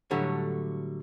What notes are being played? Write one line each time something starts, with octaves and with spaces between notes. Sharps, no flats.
A2 D3 F#3 G3 A3